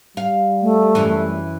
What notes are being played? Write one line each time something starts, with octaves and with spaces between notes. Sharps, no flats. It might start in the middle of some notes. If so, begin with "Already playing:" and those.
G3 F5
A3
F#2 E3